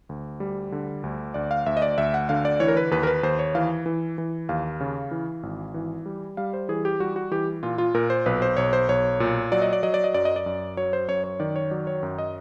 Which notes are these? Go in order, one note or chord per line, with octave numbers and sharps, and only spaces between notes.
D2
G3
D3
D2
D2 D5
F5
D2 E5
D#5
D5
D2 E5
F#5
D3 F5
D5
E3 C#5
A#4
B4
D#2 B4
A#4
B4
D#2 C5
C#5
E3 F5
E3
E3
D#2 F5
C#3
E3
G#1
E3
G3
G3 F5
C5
E3 G#4
G4
G3 F#4
F#4
E3 G4
A#2 F4
F4
A#2 A#4
C5
B1 B4
C5
B1 C#5
C5
B1 C#5
A#2
F#3 D5
D#5
D5
F#3 D#5
D5
D#5
F#2 D5
D#5
D5
F#2
F#3 C#5
C5
F#2 C#5
C#5
D#3 D5
C#5
F#3 D5
C#5
F#2
D#5